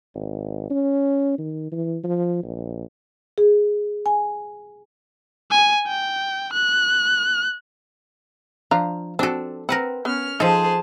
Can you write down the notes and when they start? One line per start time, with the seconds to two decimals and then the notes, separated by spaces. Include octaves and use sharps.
0.15 G#1
0.70 C#4
1.38 D#3
1.72 E3
2.04 F3
2.43 A#1
3.38 G#4
4.06 G#5
5.51 G#5
5.88 G5
6.53 F#6
8.71 F3 D4 F5 A#5
9.19 C4 D4 F#4 A4
9.69 C4 A#4 B4 F#5
10.05 B3 C#4 F6
10.40 F3 D#4 G#4 A4 C5 A5